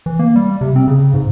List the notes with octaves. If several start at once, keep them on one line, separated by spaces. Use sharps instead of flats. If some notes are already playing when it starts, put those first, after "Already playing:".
E3
A#3
G3
C3
C4
C#3
G#2